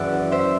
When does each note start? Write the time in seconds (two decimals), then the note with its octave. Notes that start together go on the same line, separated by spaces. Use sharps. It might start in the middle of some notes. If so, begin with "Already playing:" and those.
Already playing: F#1 F#2 E3 D5 E5 F#5
0.31 C5 E5